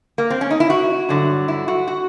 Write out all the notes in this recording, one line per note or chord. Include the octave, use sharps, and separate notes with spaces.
A#3
C4
C#4
D#4
E4
F#4
G2 D3 F#3
E4
F#4
F#4